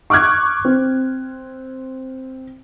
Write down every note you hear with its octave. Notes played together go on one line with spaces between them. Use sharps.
C#6 D6 F6 F#6 G#6
C4